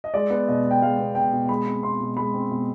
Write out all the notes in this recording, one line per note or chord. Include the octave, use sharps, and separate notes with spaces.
D#5
G#3 D5
B3
B2 D#5
B2
G5
G#3 F5
B3
B2 G5
B2
G#3 B5
C4
B2 C6
B2
G#3 B5
C4
B2